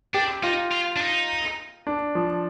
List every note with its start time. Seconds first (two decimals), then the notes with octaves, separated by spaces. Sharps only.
0.14 D4 G4
0.43 D#4 F4
0.72 F4
0.96 D4
1.01 D#4
1.87 D4
2.15 F3